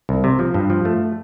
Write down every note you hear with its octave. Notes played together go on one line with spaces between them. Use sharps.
C2
C3
F3
G2
F3
A3